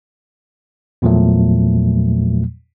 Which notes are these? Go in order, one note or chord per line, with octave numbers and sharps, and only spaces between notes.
E2 A#2 F3 F#3 A3